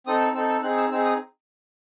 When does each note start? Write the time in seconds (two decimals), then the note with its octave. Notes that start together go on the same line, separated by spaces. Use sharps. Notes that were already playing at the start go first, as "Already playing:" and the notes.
0.07 C4 D#4 A4 D#6
0.20 E6
0.34 C4 D#4 A4 E6
0.49 E6
0.63 C4 D#4 G#4 F#6
0.77 E6
0.91 C4 D#4 G#4 E6
1.05 D#6